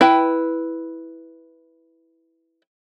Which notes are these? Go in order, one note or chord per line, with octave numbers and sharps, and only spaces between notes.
E4 B4 G5